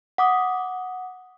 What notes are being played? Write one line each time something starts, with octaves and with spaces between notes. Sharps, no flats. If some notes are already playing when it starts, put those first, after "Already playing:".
F#5 D6 D#6